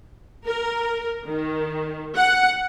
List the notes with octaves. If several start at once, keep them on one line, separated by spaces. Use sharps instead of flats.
A#4
D#3
F#5